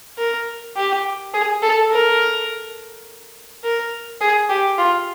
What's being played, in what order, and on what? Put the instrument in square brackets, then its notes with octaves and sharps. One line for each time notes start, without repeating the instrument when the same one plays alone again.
[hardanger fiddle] A#4
G4
G#4
A4
A#4
A#4
G#4
G4
F4